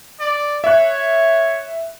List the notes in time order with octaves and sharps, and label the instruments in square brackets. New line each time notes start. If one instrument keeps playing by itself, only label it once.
[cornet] D5
[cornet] C#5 [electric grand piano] E5 F#6